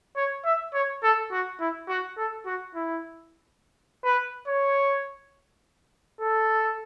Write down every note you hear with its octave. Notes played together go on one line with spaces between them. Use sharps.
C#5
E5
C#5
A4
F#4
E4
F#4
A4
F#4
E4
B4
C#5
A4